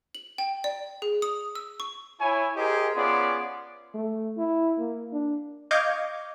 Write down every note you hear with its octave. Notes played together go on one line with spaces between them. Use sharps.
F#7
G5
D5
G#4
D#6
E6
C#6
E4 C#5 G#5
G4 G#4 A#4 C5 D#5
B3 C#4 F4 G#4 D5 C6
A3
E4
A#3
D4
D#5 F5 C#6 D6 G6 G#6